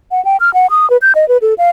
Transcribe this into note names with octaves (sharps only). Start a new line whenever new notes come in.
F#5
G5
F6
F#5
D#6
B4
G6
D#5
B4
A4
F5